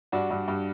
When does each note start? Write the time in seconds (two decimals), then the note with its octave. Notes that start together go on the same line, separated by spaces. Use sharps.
0.12 G2 D4 F#4
0.31 G2
0.48 G2